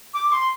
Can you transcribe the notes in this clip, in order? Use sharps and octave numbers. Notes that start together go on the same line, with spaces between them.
D6
C6